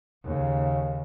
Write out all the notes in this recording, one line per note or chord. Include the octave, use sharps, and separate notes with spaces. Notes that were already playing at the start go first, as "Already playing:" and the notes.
D#2 C#3